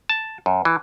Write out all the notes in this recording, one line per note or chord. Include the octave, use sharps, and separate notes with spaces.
A5
F#2
E3